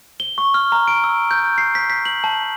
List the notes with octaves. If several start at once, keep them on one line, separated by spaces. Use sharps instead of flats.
G7
C#6
F6
A#5
D7
E6
G6
C7
B6
B6
F#7
A5